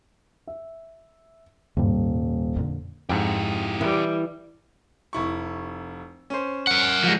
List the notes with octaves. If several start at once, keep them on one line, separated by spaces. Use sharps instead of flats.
E5
D#1 G#2 C3 G3
F2 A#2 D3
F2 G#2 E4 G4
E3 G3
F1 E4 C#6
C#4 C5
A#4 F#5
F3 G#3